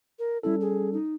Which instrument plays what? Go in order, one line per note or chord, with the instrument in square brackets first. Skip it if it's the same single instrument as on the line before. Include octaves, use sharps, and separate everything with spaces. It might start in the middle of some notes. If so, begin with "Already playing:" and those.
[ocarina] A#4
[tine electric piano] G3 C#4 A4 [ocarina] E4
[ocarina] G#4
D#4